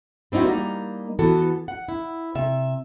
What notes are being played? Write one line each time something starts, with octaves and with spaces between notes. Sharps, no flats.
G3 C4 D#4 E4 F#4
G3 A#3 D#4
E3 B3 F#4 A4
F#5
E4
C3 E5